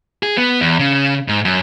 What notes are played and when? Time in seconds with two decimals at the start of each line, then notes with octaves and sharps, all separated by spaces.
0.23 G#4
0.38 B3
0.61 E2
0.79 C#3
1.28 G#2
1.45 F#2